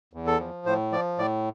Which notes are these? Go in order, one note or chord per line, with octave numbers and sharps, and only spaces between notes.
E2
A4
F3
A2 C5
F3 D5
A2 D5